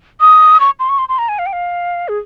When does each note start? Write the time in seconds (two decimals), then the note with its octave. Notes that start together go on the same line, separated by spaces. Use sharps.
0.21 D#6
0.60 C#6
0.79 C6
0.89 C#6
0.98 C6
1.09 C6
1.18 A#5
1.29 G#5
1.39 F5
1.46 G5
1.53 F5
2.08 G#4